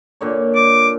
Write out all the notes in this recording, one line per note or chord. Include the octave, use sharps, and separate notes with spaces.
A#2 D3 C#5
D6